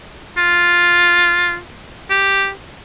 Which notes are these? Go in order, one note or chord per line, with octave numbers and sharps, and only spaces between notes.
F4
G4